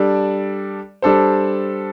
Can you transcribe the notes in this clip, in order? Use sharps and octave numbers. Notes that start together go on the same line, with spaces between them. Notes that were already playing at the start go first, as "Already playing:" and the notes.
Already playing: G3 D4 A4 D5
G3 D4 A4 C5